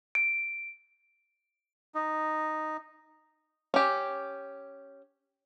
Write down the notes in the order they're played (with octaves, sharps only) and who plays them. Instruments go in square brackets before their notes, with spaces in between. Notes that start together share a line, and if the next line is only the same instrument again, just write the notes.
[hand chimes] D7
[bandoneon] D#4
[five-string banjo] C#4 G4